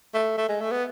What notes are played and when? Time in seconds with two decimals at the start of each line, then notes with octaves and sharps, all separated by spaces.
0.14 A3
0.38 A3
0.49 G#3
0.61 A3
0.71 B3